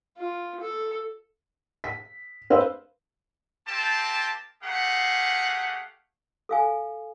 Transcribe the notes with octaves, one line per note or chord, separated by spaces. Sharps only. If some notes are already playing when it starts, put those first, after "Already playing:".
F4
A4
B6
B4 C5 F5 E6
A#3 C4 G4 A5
A3 A#3 G4 G#4 F5 F#5
A4 F5 G#5